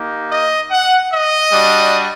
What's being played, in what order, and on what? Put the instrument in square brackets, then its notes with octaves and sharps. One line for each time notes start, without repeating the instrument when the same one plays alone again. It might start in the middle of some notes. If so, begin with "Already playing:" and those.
Already playing: [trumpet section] A#3 D#4 G4
D#5
F#5
D#5
G3 D4 F#4